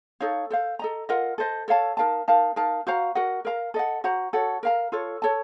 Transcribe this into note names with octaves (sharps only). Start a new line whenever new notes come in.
D#4 A4 C#5 F5
A4 C5 F5
A4 D#5 A#5
F4 A#4 D#5 F#5
A4 C5 D#5
A4 C#5 F5 A5
D#4 A#4 F5 A5
D#4 A#4 F5 A5
D#4 A#4 F5 A5
F#4 C5 F5 A#5
F#4 A#4 D#5 F#5
A#4 F5 A#5
A4 D#5 F#5
F#4 C5 F#5 A#5
F#4 A4 C#5 F#5
A#4 F5 A#5
F4 A4 C#5
A4 C#5 A5